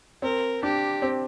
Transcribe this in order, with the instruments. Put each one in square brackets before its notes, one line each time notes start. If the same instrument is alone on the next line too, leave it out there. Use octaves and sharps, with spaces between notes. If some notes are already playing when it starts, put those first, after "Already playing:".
[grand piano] C4 [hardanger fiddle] A#4
[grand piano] D4 [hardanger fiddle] G4
[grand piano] C4